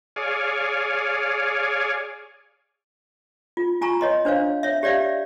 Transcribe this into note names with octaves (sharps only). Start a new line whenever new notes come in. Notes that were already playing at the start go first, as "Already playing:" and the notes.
G#4 C#5 D5 F5 G#5
F4
F4 G#5 A#5 C#6
C#5 D#5 C6
D4 C5 C#5 F5
C#5 E5
G4 C#5 D5 E5 F5